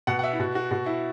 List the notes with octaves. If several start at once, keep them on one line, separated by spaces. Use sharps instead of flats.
B2 F#5
F#5
E5
E4
B2 F#4
F#4
B2 F#4
E4